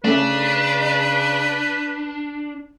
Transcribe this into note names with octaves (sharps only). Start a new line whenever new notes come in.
C#3 A3 C#4 D4 A4 B4